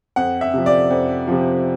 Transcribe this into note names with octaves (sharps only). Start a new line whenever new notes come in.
F2 F#5
E5
C3 F3
D5
F2
C3 F3